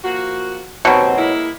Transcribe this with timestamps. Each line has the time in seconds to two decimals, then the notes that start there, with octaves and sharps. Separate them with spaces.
0.04 F3 A#3 F#4
0.85 D#2 B2 F#3 C4
1.17 G#3 A#3 E4